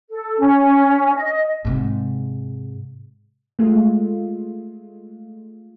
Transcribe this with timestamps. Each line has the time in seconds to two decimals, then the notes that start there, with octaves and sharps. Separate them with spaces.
0.10 A4
0.39 C#4
1.15 D#5
1.65 G#2 C3
3.59 G#3 A3 F4